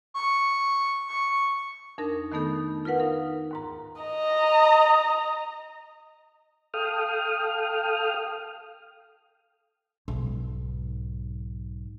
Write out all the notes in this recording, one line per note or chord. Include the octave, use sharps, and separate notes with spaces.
C#6
C#6
F2 D4 D#4 A#4 A#6
D#3 A3 B3 D#4 A4 G6
F4 A#4 B4 F#5
D#4 A#4 F5
D#2 G#2 A#5
D#5 A#5
A4 F5 G5 D#6 F6
B1 G#2